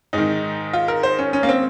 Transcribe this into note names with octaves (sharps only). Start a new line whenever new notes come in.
G#2 D#3 D#4
F4
A#4
C5
C#4
C#4
A#3
C4